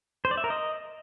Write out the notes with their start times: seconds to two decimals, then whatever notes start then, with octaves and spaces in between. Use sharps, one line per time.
0.25 C5
0.31 D5
0.37 E5
0.44 A#4
0.50 D#5